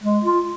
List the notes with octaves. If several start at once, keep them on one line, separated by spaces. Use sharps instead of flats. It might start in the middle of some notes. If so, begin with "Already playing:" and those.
G#3
F4